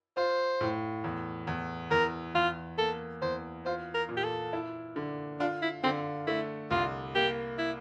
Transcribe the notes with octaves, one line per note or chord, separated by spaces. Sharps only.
F4 C5
A2
E2
E2
E2 A#4
E2 F4
A#3 A4
E2 C5
F4 C5
A#4
A#2
G4
A4
E4
D3
D4 F4
E4
D3 C4
A3 E4
C2 F4
A#3 G4
E4